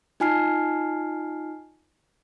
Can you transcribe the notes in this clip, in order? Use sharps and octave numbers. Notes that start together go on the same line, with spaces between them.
D#4 F4 G#5 A5 F6 C7